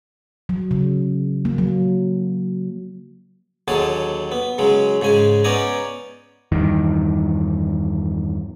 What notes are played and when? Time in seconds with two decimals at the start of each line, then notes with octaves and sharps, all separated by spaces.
0.49 F#3
0.71 C#3
1.45 A#3
1.58 F#3
3.68 D#2 D3 F#3 G#4 A5
4.32 B3
4.58 C#3 F#3 G#3
5.02 G#2 C#3 G#3 G#5
5.44 B3 C#4 D#4 D5 G#5 A#5
6.52 E2 G2 D#3